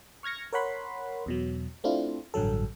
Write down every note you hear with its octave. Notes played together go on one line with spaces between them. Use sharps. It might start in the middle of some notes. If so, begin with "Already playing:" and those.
C#6 F6 G#6 A#6 C#7
A#4 C#5 F#5 B5 C6
E2 B2 F#3
A3 C4 D4 E4 F4
A1 G2 D3 F#3 A4